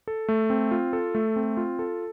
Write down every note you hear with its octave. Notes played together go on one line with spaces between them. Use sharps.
A4
A3
C4
F4
A4
A3
C4
F4
A4